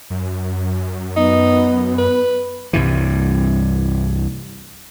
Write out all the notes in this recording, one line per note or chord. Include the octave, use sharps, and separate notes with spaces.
F#2
B3 D#4
B4
C2 G2 E3